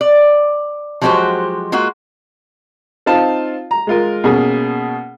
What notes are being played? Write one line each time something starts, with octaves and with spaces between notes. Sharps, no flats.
D5
F3 F#3 G#3 F#4 G4 C5
G#3 A#3 F4 F#4
C4 D#4 F4 F5 A5
A#5
G#3 F4 A#4
B2 A#3 C#4 G#4